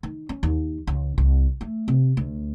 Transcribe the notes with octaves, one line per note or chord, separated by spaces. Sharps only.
D#3
C#4
D#2
C#2
C2
A3
C3
D2